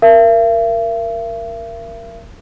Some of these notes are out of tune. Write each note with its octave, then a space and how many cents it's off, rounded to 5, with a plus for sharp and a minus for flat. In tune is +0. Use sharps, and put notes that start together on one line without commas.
A#4 +0 E5 +45